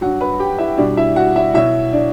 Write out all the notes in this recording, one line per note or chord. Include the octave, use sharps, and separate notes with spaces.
G2 F#3 F#4 F#5
B4 B5
G4 G5
E4 E5
B2 G3 D4 D5
E4 E5
F#4 F#5
E4 E5
B2 F#3 E4 E5
D4 D5